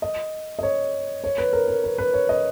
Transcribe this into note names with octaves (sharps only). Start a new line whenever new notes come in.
D#5
D#5
C#5
C#5
B4
A#4
A#4
B4
B4
C#5
D#5